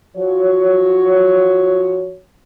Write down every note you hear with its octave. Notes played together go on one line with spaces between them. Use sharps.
F3 F#4 C#5